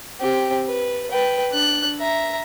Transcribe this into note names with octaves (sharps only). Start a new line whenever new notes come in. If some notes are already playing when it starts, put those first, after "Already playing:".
C4 G4
B4
B4 G5
D4 F#6
E5 A#5